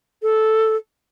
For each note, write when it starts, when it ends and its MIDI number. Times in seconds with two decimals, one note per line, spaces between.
0.23 0.76 69